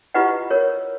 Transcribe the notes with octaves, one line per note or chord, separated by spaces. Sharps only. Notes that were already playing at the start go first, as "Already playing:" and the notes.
E4 F4 G4 B4 D#5 F#5
A#4 C#5